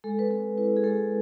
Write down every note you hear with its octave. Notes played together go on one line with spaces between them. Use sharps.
G#3 A4
B4
C4 A4
E4 B4
G#4
G#3 A4